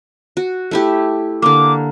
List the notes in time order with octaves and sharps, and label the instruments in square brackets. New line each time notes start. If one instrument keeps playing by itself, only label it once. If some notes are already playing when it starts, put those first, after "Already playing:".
[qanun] F#4
A3 E4 G4
[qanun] D3 A#3 [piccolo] D6